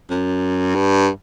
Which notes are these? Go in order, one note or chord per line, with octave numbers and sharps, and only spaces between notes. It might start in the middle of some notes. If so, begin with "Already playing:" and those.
F#2
G2